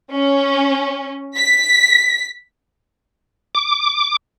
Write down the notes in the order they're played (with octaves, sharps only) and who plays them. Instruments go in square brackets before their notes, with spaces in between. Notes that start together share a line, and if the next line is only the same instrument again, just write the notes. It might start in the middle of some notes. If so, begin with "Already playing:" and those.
[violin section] C#4
B6
[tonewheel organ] D6